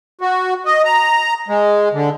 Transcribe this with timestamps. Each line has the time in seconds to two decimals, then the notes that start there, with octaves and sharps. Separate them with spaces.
0.21 F#4
0.66 D#5
0.85 A#5
1.48 G#3
1.93 D3